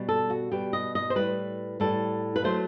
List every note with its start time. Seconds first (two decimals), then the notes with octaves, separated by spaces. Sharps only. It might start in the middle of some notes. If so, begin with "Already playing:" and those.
Already playing: B2 G3
0.09 A4
0.30 F#4
0.52 B2 G3 G4
0.73 D#5
0.95 D#5
1.10 C5
1.15 A2 G3 B4
1.80 A2 G3 A4
2.36 B4
2.44 F#3 A3 C5